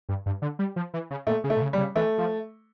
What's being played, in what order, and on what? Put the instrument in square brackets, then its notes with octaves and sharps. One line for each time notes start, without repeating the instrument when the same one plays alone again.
[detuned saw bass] G2
G2
D3
G3
F3
E3
C#3
[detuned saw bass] A#2 [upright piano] A3
[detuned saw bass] C#3
[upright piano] A3
[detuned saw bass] A#2
C#3
[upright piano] G3
[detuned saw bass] C#3
[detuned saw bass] E3 [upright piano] A3
[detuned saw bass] F3